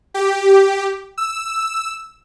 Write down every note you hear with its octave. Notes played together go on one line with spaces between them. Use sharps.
G4
E6